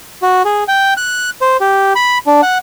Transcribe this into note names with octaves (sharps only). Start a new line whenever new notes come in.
F#4
G#4
G5
F#6
C5
G4
B5
D4
F#5